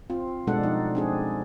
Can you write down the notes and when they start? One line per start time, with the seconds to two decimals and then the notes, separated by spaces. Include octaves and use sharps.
0.10 C4 F4
0.47 B2 G3 G#3 D4 A4 F#5
0.61 F3 D#4
0.95 C4 D4 G#4